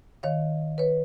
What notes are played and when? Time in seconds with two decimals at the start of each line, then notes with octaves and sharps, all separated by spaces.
0.23 D#3 C#5 F5
0.78 B4 C#5